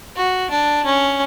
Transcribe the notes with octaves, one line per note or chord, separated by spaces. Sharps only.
F#4
D4
C#4